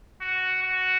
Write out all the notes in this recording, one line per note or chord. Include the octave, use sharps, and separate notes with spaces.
F#4
F#4